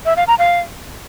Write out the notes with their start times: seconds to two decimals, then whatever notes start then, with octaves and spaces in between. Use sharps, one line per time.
0.05 E5
0.17 F5
0.28 A#5
0.39 F5